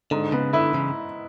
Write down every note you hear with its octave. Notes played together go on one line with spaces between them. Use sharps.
G#2 D3
C#3 B3
D3 E4
C#3 E3